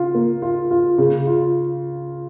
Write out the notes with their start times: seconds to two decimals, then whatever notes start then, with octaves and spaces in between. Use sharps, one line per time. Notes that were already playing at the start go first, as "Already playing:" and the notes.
Already playing: C#3 F4
0.15 A#3
0.42 F4
0.71 F4
0.98 C#3
1.27 F4